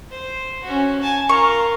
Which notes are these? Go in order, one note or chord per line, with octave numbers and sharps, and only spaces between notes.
C5
C#4 F#4
G#5 A5
F4 A#4 C#6